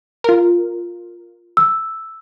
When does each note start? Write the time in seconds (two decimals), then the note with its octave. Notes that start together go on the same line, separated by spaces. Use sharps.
0.24 F4 A#4
1.57 E6